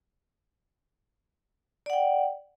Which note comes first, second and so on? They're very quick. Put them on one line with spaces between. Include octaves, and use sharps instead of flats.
D5 F#5 G5